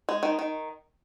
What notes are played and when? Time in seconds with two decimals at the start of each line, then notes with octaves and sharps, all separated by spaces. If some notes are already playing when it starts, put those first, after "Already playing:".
0.09 G#3
0.23 D#3
0.39 D#3